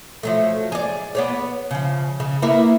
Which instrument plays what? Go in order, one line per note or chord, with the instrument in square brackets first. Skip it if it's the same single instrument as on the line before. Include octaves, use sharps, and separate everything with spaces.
[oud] F3 F#3 A3
G#4 D5
B3 C#5 D5
C#3 F3
C#3
A#3 B3 E4